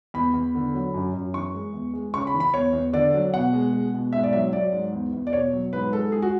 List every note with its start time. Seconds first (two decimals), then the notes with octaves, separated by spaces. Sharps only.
0.14 E2 B5
0.34 E2
0.55 D3
0.74 F#3
0.94 F#2
1.14 F#2
1.34 E3 C#6
1.54 G#3
1.74 E2
1.94 G#3
2.13 C#3 C#6
2.27 B5
2.34 E3
2.40 B5
2.53 E2 C#5
2.73 E2
2.93 D3 D5
3.14 F#3
3.33 B2 F#5
3.53 G#3
3.73 G#3
3.94 B2
4.13 G#2 E5
4.24 D5
4.33 F#3 E5
4.53 F#3 D5
4.73 G#2
4.93 E2
5.13 E2
5.27 D5
5.33 B2 C#5
5.53 F#3
5.73 G#2 B4
5.92 G#3 A4
6.12 G#3 G#4
6.22 F#4